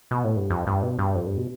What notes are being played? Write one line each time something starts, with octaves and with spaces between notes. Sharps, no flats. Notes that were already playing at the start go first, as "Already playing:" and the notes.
B2
A2
G2
F2
G2
B2
G2
F2
G2
B2